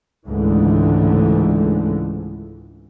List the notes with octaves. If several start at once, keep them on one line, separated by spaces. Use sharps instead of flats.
C#2 G#2 D3 E3 A3